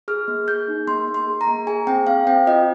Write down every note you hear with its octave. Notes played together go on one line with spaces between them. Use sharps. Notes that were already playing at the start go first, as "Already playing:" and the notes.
G#4 F6
A#3
G#4 G6
D#4
A#3 C6
A#3
C6
G#4
A#5
A#3
G#4 G#5
C4 G5
C4 F5
C4 G5
F4 D#5